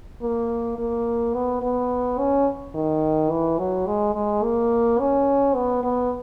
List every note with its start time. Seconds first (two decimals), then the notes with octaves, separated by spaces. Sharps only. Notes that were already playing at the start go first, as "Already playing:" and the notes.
0.22 A#3
0.78 A#3
1.34 B3
1.62 B3
2.19 C#4
2.74 D#3
3.30 E3
3.59 F#3
3.86 G#3
4.15 G#3
4.43 A#3
4.99 C#4
5.55 B3
5.83 B3